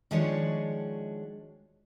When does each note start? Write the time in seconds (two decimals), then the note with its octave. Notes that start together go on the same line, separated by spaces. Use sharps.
0.11 D#3 F3 G#3 D4 F#4 C#5